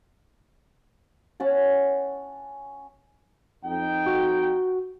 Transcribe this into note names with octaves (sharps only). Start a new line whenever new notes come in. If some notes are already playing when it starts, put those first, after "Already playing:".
C#4 F#5 A5
F2 D#4 G5
F#4